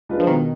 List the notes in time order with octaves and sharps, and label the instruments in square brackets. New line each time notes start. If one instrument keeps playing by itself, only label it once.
[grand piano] G#3 D4 F4 B4
[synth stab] F3
[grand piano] B2 [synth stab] D#3